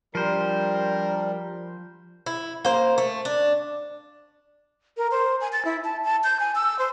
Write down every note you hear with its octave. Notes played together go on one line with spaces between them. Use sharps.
F3 G3 D4 A#4 C5
E4
A#3 C5
A3
D4
A#4
C5
G#5
A6
E4
A5
A5
G6
G#5
E6
C5